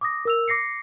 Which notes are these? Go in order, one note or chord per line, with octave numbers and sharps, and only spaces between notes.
D6 D#6 A#6
A#4 E6 F7
D6 A#6 C7 C#7